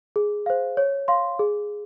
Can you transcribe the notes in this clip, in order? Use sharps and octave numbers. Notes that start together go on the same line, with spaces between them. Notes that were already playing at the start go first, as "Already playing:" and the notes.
G#4
C5 F5
C#5
F5 C6
G#4